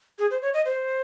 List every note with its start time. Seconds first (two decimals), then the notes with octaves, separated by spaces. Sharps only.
0.19 G#4
0.31 C5
0.42 C#5
0.54 D#5
0.65 C5